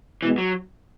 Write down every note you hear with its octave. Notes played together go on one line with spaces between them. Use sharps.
B2 E3 G#3 B3
F#3